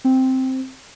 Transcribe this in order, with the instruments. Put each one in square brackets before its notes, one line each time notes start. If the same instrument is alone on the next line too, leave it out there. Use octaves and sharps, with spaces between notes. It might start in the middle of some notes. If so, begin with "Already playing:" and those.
[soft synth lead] C4